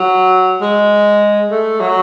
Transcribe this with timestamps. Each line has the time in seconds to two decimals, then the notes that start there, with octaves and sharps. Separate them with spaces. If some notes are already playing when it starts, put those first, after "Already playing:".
Already playing: F#3
0.61 G#3
1.51 A3
1.81 F#3